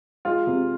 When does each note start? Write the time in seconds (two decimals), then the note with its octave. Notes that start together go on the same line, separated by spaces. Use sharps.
0.25 G#3 F4
0.47 C3